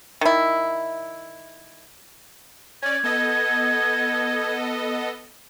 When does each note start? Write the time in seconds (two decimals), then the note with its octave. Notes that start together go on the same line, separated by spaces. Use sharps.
0.21 D#3 E4
2.82 C#4 D5 G#6
3.03 B3 A4 D#5